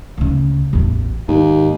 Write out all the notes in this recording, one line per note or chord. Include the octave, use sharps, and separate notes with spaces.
D2 C#3
A1 E2
D#2 G#2